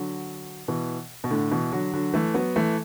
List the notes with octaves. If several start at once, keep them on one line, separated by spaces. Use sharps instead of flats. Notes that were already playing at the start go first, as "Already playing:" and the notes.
Already playing: D3 F#3
B2 E3
B2
A2 D3
B2 E3
D3 F#3
D3 F#3
E3 A3
F#3 B3
E3 A3